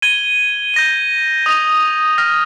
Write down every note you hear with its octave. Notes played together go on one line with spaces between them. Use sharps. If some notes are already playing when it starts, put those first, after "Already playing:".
G#6 D#7 G7
G6 A#6 D#7
D#6 A#6 F7
F6 A#6 F7